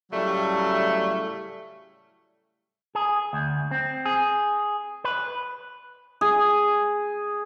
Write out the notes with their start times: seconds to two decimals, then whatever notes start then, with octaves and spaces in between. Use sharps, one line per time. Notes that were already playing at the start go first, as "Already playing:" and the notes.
0.12 A2 C#3 F#3 G3 A3
2.95 G#4
3.33 D2
3.71 C4
4.06 G#4
5.04 B4
6.21 G#4